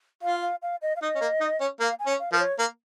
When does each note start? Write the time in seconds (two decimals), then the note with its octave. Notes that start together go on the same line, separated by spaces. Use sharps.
0.22 F4 F5
0.42 F5
0.62 F5
0.82 D#5
0.96 F5
1.02 D#4 D#5
1.15 C#4
1.21 A#3
1.41 D#4
1.60 C#4
1.80 A#3 F5
1.99 G#5
2.06 C#4
2.19 F5
2.32 F3 A#4
2.39 C#5
2.59 A#3